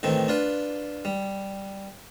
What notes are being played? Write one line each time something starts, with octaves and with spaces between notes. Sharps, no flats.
A2 D#3 E3 C4
D4 F4 B4
G3